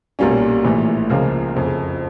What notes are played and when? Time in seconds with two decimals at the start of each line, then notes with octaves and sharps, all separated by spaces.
0.19 B1 A#2 G3 A#3 C#4
0.64 A#1 A2 E3
1.09 C#2 C#3 F3 A#3
1.55 F#1 F2 C#3